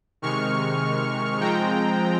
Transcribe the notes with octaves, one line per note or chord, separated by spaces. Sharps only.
C3 D#3 G#3 C#6 F6
F3 G#3 C4 G5 A#5